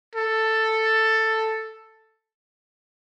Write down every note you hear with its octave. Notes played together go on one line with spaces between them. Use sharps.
A4